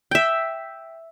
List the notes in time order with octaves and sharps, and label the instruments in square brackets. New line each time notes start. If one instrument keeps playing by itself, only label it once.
[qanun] E5 G5